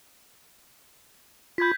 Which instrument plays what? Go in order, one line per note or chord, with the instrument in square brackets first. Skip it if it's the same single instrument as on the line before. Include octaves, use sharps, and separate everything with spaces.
[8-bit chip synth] F4 B5 [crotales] G6 G#6 B6